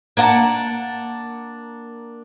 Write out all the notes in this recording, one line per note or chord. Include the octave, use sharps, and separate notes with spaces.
A#3 D4 F#5 A5